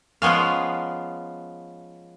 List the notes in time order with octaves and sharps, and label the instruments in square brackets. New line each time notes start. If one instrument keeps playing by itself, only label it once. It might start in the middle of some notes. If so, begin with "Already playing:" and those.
[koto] F3 G#3 B3 C#4 F5